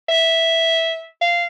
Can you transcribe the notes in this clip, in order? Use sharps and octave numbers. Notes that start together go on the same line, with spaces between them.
E5
F5